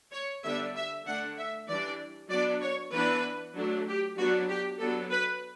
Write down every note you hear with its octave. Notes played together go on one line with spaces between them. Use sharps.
C#5
D3 G3 B3 D4 E5
E5
D3 A3 D4 F#5
E5
E3 G3 D4 D5
F#3 B3 D4 D5
C#5
E3 B3 D4 B4
F#3 A3 D4
G4
F#3 B3 D4 F#4
G4
F#3 B3 D4 A4
B4